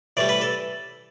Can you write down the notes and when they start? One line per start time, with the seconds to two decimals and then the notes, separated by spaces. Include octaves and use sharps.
0.17 A2 E3 G3 D5
0.29 B4
0.42 A4